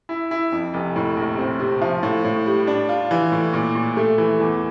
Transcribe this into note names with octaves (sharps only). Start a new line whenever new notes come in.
E4
E4
F2
F1
A2
A#1
C4
C3
F3
A2
A2
G3
D4
F4
E3
A2
A#2
A#2
A3
E3
E2